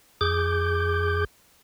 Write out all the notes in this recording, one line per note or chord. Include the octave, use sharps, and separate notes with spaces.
F2 G#4 D6 G6